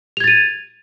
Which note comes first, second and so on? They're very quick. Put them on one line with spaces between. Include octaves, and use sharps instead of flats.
F7 G#6 A6 D#7